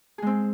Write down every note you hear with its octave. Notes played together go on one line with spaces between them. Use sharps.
G#3 C4 G#4